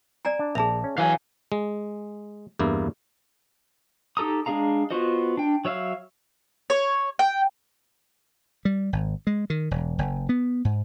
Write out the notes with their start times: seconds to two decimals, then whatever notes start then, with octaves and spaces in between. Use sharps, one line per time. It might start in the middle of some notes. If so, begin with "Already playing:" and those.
0.25 D5 G#5 A#5
0.39 D4
0.55 A#1 G#4 E5 A5 F7
0.84 C#4
0.98 E3 F#3 F5 G#5
1.52 G#3
2.59 E2 G2 A#3 E4
4.17 D#4 G4 A4 A#5 D#6
4.46 G#3 D4 G#4 F5 A#5
4.91 B3 F4 F#4 C5 D#5
5.37 D4 G5
5.65 F#3 C#5 E5 F5 F6
6.70 C#5
7.19 G5
8.65 G3
8.93 G#1
9.27 G#3
9.50 D#3
9.71 E1
9.99 F#1
10.29 B3
10.65 G#2